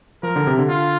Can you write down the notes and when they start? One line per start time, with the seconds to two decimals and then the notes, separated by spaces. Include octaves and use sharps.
0.23 F3 A#4
0.36 D3
0.47 C3
0.59 D3
0.69 F4